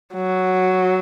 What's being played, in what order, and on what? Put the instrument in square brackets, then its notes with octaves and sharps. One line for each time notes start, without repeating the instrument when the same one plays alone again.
[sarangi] F#3